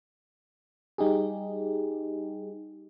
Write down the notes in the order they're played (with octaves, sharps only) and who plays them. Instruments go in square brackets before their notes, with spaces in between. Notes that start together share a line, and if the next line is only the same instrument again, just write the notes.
[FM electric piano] G3 D#4 G4 G#4